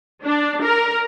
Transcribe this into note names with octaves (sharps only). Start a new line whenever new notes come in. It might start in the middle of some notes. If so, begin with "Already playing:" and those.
D4
A#4